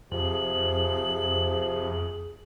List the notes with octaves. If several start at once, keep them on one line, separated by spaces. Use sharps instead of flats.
F2 C3 F3 G#4 F#7